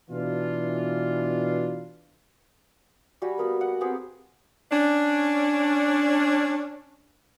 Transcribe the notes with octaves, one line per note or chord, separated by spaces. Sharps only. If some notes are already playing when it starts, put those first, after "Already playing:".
B2 E3 D4 F4
G3 F#4 G4 G#5
A#3 B3 A#4
F#5
B3 C4 G4 G#4
C#4 D4